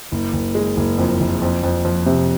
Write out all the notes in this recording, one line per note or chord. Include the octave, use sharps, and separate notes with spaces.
F#1
F#1
G#3
F#1
F2
F#1
F2
F2
F3
C3